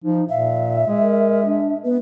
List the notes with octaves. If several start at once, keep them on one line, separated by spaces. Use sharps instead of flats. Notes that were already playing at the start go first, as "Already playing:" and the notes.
F3 D#4
A#2 E5 F5
G#3
A#4
D4
B3 B4